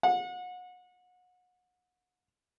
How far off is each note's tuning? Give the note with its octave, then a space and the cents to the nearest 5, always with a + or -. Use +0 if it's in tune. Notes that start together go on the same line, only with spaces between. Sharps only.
F#5 -30